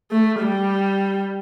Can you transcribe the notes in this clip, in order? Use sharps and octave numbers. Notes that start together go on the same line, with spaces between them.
A3
G3